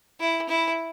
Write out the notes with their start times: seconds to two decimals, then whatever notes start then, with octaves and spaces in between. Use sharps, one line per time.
0.20 E4
0.49 E4